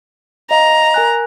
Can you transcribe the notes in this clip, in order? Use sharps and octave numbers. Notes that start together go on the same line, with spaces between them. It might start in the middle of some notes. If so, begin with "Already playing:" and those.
D#5 F5 A#5
A#4 G#5 F#6